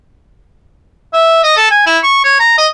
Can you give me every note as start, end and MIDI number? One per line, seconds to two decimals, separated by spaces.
1.13 1.40 76
1.43 1.56 75
1.56 1.69 69
1.71 1.83 80
1.87 1.98 64
2.03 2.23 85
2.24 2.36 73
2.40 2.55 82
2.58 2.67 75